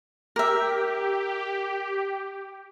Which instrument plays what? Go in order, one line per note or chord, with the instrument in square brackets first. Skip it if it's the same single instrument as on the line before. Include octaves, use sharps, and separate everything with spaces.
[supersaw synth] G4 [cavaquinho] A#4 E5